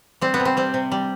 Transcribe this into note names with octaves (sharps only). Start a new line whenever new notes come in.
G3 C4
B3
C3
C4
G3 C4
C3
G3